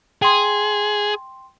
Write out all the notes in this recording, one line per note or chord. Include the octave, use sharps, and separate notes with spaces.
G#4 G5 C6